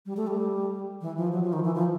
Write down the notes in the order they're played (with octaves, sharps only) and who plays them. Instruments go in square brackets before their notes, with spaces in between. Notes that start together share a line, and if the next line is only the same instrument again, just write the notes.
[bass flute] G3
A3
G3
E3
F3
F#3
F3
D#3
E3
F3